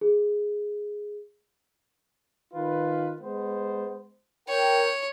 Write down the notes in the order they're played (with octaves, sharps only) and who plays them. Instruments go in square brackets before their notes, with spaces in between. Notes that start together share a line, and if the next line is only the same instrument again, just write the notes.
[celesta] G#4
[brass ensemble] D#3 F4 B4
G#3 B3 C5
[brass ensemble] A#4 G5 [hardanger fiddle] C#5